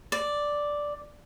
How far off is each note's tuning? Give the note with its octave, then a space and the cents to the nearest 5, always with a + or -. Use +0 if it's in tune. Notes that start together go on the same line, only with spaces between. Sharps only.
D5 +0